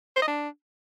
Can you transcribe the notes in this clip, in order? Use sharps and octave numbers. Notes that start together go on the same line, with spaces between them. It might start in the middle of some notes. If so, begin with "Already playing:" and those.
C5
D#5
D4